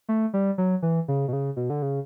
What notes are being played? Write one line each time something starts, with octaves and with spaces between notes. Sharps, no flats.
A3
G3
F#3
E3
C#3
B2
C#3
B2
D3
C#3